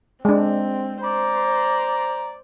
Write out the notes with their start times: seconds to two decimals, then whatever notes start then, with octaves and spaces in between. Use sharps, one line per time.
0.25 G#3 C4 D4
1.03 C5 D5 A#5